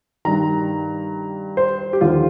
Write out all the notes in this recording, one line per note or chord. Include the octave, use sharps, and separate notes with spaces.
G2 D#3 A#5
C5
G4
D#2 D3 F3 F4